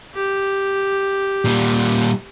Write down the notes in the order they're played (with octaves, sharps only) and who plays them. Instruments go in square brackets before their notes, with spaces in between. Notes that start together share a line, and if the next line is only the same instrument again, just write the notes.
[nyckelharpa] G4
[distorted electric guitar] A#2 G3